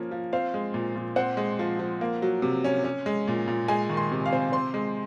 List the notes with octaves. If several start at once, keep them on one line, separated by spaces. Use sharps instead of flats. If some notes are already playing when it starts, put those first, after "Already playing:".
Already playing: F3 A#3 C#4
F3
C4 F5
G#3
A#2
A#2
C4 F#5
G#3
F3
F3
A#3
F#3
C3
C#4
C#4
G#3
A#2
A#2
G#3 G#5
D#3
C6
C3
F5
C4
C4 C6
G#3